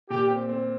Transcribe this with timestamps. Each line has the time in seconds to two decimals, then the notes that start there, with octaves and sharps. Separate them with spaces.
0.10 A#2 G4
0.30 C4
0.49 C4